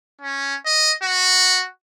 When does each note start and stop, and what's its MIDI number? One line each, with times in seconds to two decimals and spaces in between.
0.21 0.55 61
0.66 0.92 75
1.03 1.66 66